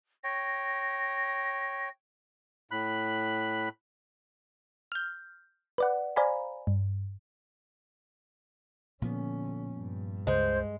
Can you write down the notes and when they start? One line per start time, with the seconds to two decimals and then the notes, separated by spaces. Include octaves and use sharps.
0.24 C#5 G5 A#6
2.71 A2 B5 F#6
4.92 F6 G6
5.78 B4 D5 F#5
6.16 C5 D5 F5 G#5 A#5 B5
6.67 G2
9.02 A#2 D3 F3 B3 C#4
9.72 G2
10.27 C#2 C#3 G#3 C5